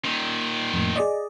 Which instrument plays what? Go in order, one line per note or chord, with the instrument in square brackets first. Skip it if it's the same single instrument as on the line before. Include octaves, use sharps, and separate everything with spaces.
[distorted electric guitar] A#2 D#3
[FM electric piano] F2 A2
G#4 D5 D#5